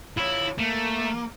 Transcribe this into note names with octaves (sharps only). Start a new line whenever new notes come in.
E4 F4 C#5
A3 A#3